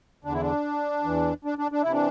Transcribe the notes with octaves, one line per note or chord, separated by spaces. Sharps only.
E2 D3 D4
E4
D4
E2 E3
D4
D4
D4
C3 E3 E4
D4